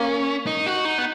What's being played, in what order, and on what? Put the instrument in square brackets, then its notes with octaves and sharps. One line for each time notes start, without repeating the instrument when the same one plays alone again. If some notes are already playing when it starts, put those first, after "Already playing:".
Already playing: [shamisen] A#3 [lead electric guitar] C#4
[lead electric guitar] D#4
F#4
D#4
B3